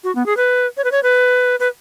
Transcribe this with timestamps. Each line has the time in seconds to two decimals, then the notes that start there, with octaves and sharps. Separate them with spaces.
0.04 F#4
0.15 B3
0.26 G#4
0.37 B4
0.77 C#5
0.84 B4
0.92 C#5
1.03 B4
1.60 B4